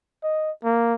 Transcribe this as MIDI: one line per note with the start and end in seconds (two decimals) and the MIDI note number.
0.24 0.51 75
0.64 0.94 58